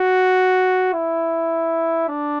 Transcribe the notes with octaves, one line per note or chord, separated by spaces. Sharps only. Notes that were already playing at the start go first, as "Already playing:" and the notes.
Already playing: F#4
E4
D4